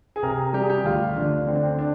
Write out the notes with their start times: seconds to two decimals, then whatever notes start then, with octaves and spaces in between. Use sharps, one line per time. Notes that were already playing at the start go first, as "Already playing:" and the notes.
0.16 G#4
0.23 C3 A#4
0.53 G3 G4
0.62 G#4
0.70 G4
0.84 D2 F4
1.16 D2 D4
1.47 D3 C4
1.55 D4
1.63 C4
1.79 D4